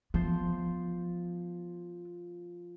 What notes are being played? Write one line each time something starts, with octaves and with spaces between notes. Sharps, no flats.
F3 B3 C5